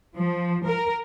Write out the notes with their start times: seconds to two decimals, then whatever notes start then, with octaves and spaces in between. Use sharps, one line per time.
0.16 F3
0.67 A#4